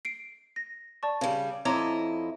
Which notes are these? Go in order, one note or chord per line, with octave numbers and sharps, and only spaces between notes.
C7 D7
A#6
D5 A5 C#6
C#3 G3
F2 E4 C#5 D#5 A#5 D6